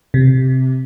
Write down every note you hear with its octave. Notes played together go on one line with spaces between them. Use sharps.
C3